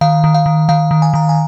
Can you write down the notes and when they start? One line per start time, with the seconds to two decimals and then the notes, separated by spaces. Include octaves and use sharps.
0.01 D#3 F5
0.24 D#3
0.34 F5
0.46 D#3
0.69 D#3 F5
0.91 D#3
1.02 G#5
1.14 D#3 A#5
1.29 G#5